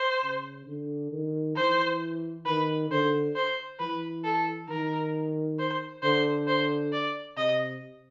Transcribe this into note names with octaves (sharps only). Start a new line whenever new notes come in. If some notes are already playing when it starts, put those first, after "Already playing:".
Already playing: C5
C#3
D3
D#3
E3 C5
D#3 B4
D3 C5
C5
E3 B4
A4
D#3 A#4
C5
D3 C5
C5
D5
C3 D#5